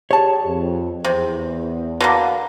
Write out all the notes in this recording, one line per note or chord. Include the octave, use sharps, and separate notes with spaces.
G4 G#4 C#5 A5
F2
E2 C3
B2 D3 A#3